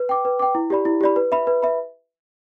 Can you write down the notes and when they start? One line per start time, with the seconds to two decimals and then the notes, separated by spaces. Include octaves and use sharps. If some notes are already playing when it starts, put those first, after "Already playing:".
Already playing: B4
0.09 G5 D6
0.25 B4
0.39 G5 D6
0.55 E4
0.70 G4 D5 B5
0.85 E4
1.01 G4 D5 B5
1.16 B4
1.32 E5 B5
1.47 B4
1.62 E5 B5